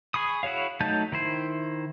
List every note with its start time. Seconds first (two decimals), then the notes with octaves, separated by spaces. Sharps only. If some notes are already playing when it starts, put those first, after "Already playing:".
0.14 G#4 B5 C#6 D#6
0.43 E4 F#4 G#4 C#5 F5
0.81 F#3 A3 D#4 A5 G6
1.12 D#3 E4 C5